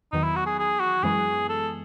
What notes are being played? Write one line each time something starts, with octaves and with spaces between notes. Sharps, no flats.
E2 D#3 F#3 B3 D#4
E4
F#4
G#4
G#4
F#4
F#2 E3 G#3 B3 G#4
A4